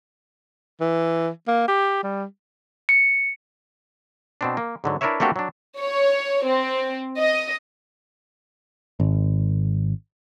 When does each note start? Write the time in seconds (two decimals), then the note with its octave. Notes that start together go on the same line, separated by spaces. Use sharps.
0.81 E3
1.48 A#3
1.68 G4
2.03 G3
2.89 C#7
4.41 B2 C4 D4
4.57 A#3
4.84 G#2 D3 F#3
5.01 D4 E4 A#4 B4 C#5 E5
5.20 A3 A#3 C4 D4 F#4 G4
5.36 F#3 D4
5.78 C#5
6.45 C4
7.18 D#5
9.00 G#1